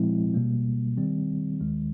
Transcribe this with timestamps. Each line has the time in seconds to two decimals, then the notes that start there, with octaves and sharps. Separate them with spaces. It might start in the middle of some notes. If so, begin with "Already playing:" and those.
Already playing: A#2 F3 G#3 C4 E4
0.34 B2 G3 A#3
0.97 D#3 G3 C4
1.60 D#2 D#3 G#3